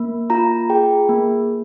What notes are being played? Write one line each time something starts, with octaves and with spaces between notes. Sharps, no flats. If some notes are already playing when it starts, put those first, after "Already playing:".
Already playing: A#3
F4 A#5
G#4 G5
A#3